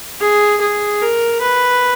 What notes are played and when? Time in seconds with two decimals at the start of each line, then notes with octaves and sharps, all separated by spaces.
0.21 G#4
0.61 G#4
1.02 A#4
1.41 B4